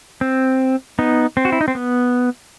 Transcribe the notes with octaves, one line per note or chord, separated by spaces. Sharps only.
C4
B3 D#4
C4
F#4
E4
D#4
C4
B3